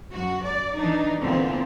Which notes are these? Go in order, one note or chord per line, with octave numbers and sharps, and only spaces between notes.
F#2 F#4
D5
E3 D4 D#4
A#2 D3 E3 B3 C4